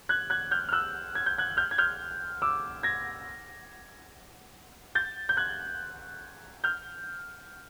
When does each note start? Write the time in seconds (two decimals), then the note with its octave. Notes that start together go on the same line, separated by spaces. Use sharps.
0.09 F#6 G#6
0.30 F#6 G#6
0.51 F6 G6
0.69 F6
0.72 E6 F#6
1.15 G#6
1.26 G6
1.38 F#6 G#6
1.57 F6 G6
1.71 G#6
1.78 F6 G6
2.42 D6 E6
2.83 G#6 A#6
4.95 G6 A6
5.29 G6
5.37 F#6 G#6
6.64 F6 G6